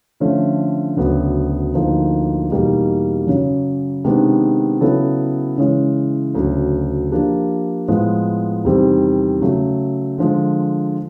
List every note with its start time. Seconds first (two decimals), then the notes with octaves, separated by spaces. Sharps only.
0.20 D3 F3 A3 C#4
0.97 D2 C#3 F#3 B3
1.74 D2 D3 F3 A#3 D#4
2.51 E2 B2 G3 A#3 D#4
3.27 F#2 C#3 F#3
4.04 C3 D#3 G#3 B3 D4
4.81 C#3 F#3 B3 E4 A4
5.58 C#3 E3 G#3 C#4
6.35 D2 C#3 F#3
7.11 F3 A#3 D4 G4
7.88 A2 F3 G#3 B3
8.65 E2 C3 D#3 G3 C4
9.42 C#3 F#3 A3
10.18 D3 F3 G#3